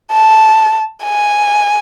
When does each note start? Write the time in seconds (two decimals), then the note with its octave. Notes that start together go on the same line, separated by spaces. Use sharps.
0.12 A5
1.04 G#5